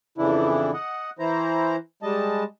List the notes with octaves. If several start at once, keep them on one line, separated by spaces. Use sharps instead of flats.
F2 C#3 E3 D4 E4
D#5 F#5
E3 E4 C5 A#5
G3 G#3 D#5 A5